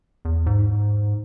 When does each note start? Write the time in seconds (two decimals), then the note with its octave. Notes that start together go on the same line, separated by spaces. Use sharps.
0.25 E2
0.46 G#2